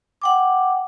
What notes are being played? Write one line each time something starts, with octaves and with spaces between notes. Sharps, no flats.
F#5 G5 D6